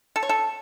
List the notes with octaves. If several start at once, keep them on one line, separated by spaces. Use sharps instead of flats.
A4
C#5
A4